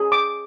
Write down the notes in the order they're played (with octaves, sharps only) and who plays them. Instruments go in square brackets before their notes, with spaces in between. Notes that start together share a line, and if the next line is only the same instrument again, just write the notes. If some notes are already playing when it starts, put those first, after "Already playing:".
Already playing: [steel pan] G#4
D6